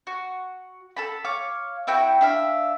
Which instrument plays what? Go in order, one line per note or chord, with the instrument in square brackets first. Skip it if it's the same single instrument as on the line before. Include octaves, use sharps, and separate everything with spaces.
[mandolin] F#4
A4 A5 B5
C#5 F5 D6
C4 E4 F#4 G5
D4 E5 F5